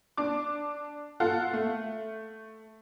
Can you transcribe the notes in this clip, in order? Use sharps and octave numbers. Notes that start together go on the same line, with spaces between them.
D4 D6
F4 A4 F5 F#5
A3